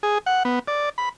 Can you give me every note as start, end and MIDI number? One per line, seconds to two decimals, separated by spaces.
0.03 0.18 68
0.26 0.43 78
0.45 0.59 59
0.68 0.89 74
0.98 1.09 83